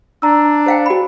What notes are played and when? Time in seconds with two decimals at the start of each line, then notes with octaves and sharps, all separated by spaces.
0.22 D4 A#5 E6
0.66 C5 F5 G5
0.86 F#4 B5